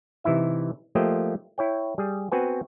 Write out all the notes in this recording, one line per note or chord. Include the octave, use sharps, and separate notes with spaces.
C3 E3 D#4 E4 E5
F3 A3 A#3 G4 C5 D#5
E4 C#5 G5
G3 G#4
B3 C4 F#4 B4 G#5